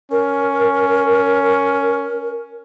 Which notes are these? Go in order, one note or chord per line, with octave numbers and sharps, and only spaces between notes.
C#4 A#4